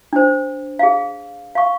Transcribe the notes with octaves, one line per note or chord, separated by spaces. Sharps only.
D4 C5
G#4 F5
F5 C#6